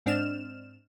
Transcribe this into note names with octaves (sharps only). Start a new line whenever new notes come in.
G#2 C4 D4 F6 E7